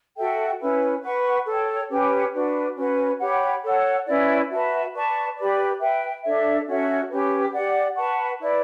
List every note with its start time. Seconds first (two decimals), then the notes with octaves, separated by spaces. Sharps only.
0.16 F#4 A4 E5 G5
0.60 C#4 E4 B4
1.03 B4 F#5 C#6
1.46 A4 C#5 G5
1.89 C#4 G4 B4
2.33 D4 F#4 B4
2.76 C#4 F#4 B4
3.19 G4 C#5 F#5 B5
3.62 A4 C#5 F#5
4.06 C#4 E4 B4 D5
4.50 F#4 B4 E5 A5
4.93 B4 D5 A5 C#6
5.35 G4 B4 D5
5.79 B4 E5 G5
6.23 D4 A4 C#5 E5
6.66 C#4 F#4 A4 E5
7.09 C#4 G4 B4
7.53 G4 D5 F#5
7.96 B4 F#5 A5 C#6
8.39 E4 B4 D5